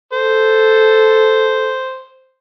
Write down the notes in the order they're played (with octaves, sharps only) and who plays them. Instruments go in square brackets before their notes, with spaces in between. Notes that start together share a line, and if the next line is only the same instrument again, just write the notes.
[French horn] A4 [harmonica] C5